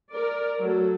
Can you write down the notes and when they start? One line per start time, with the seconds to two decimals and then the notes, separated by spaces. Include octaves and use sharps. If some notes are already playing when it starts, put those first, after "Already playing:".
0.15 A#4 D5
0.61 F#3 A3 A4